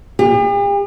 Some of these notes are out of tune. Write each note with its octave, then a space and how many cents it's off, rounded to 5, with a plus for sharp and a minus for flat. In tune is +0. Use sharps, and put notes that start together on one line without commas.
G4 +45